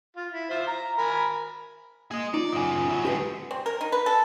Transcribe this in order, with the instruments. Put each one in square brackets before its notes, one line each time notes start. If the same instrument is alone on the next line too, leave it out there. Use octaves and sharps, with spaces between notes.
[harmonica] F4
E4
F4 C5 E5
A#5
A#4 G#5 B5
[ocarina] A#3 [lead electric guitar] G#4 D#5
[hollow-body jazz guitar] D#4 [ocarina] F4 [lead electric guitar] D5
[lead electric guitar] F#2 C#3 [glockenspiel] G#5 D#6
[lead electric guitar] E2 F#3
[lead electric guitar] G#2 D3 [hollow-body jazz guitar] G4 B4 G5
[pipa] C4
A#4
D#4
B4
A4